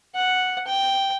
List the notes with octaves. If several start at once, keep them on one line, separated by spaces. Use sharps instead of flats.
F#5
G5